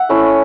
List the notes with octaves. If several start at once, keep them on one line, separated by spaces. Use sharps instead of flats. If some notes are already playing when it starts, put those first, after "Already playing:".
Already playing: E5 F#5
A3 C#4 E4